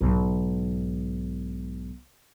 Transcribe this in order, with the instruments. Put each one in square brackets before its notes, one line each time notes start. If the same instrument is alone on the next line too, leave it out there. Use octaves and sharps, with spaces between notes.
[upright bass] B1 G#2